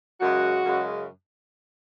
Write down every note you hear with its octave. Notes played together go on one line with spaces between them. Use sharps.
F#2 C#3 G#3 F#4
F#2 C#3 G#3